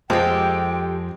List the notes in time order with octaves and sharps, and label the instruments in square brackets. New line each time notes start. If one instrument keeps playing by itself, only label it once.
[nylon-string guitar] F2 [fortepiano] F3 G#3 C4 [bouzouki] G4 A4 [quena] G5